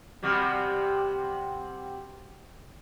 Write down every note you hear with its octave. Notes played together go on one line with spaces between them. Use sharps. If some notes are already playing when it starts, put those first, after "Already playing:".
C3 G3 F#4